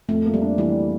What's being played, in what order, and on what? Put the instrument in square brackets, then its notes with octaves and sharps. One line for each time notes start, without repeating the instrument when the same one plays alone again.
[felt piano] F2 [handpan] A3
[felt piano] A#3
[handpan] G3
[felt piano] D4
[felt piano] E3 [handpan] G3